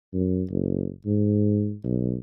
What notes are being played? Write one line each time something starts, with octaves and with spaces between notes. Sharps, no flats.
F#2
F#1
G#2
B1